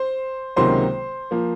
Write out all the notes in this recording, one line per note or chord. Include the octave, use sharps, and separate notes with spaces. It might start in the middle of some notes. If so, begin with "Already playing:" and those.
Already playing: C5 C6
C#2 C3 D#3 F#3 A#3 C5 C6
F3 A#3